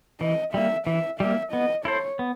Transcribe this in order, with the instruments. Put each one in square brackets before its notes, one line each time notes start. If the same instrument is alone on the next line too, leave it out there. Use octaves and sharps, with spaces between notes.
[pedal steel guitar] E3 [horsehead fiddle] D#5
[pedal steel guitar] G3 A#3 [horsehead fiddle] E5
[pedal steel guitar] E3 [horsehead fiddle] E5
[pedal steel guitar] G3 A#3 [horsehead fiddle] E5
[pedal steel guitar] B3 [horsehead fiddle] D#5
[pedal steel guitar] E4 A4 C5 [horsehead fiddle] C#5
[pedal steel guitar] B3